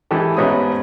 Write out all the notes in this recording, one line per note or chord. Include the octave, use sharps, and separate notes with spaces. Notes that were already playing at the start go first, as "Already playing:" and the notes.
E3 G#3 G4 A4
A1 G#2 B3 C#4 D#5 D#6